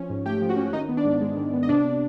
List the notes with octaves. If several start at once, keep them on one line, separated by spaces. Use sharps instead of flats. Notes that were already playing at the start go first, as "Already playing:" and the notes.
Already playing: F3 C#4
G#2
A3 G4 G5
F3
F#4 F#5
C#4
D#3 D#4 D#5
B3
D4 D5
G#2
G#3
D#3
B3
D#5
C3 D4 D5